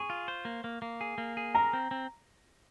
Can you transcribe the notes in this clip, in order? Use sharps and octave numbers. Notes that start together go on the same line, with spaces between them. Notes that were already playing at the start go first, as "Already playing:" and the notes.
Already playing: G#4 C#6
F4
C5
A#3
A#3
A#3
G#4
A#3
G#4
A#4 A#5
C4
C4